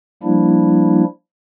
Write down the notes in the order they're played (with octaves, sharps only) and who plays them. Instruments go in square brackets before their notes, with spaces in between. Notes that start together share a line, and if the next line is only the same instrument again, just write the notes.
[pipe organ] F3 G3 A#3 D4 E4